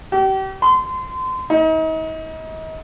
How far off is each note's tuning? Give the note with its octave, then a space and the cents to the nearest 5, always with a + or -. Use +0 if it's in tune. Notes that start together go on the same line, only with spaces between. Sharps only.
G4 -35
C6 -30
D#4 +40